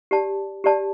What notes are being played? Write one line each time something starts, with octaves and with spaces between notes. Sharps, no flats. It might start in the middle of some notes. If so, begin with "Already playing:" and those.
G4 D5 A5
G4 D5 A5